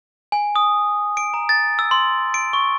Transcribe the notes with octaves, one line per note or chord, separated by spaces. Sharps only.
G#5
D#6
D7
A#5
A6
E6
C6
D7
C#6